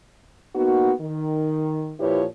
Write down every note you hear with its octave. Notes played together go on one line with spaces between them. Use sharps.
A#3 B3 D#4 F#4
D#3
A#2 F3 E4 G4 B4 C#5